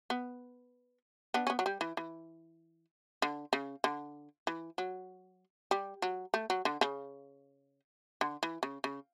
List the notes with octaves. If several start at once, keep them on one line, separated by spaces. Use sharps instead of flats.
B3
B3 D4
C#4
B3
F#3
G3
E3
E3
D3
C#3
D3
E3
F#3
G3
F#3
A3
F#3
D3
C#3
D3
E3
C#3
C#3